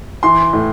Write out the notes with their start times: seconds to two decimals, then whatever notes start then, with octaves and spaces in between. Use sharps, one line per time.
0.23 E3 C6
0.53 A2